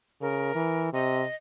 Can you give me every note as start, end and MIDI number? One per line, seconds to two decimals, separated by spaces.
0.21 0.53 49
0.21 0.90 70
0.55 0.91 52
0.93 1.24 48
0.93 1.35 75